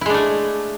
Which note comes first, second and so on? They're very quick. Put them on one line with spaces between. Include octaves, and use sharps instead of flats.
E4 G#3 D4 A3